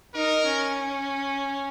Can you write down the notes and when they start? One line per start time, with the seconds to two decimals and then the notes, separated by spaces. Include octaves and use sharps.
0.14 D#4 A#4
0.45 C#4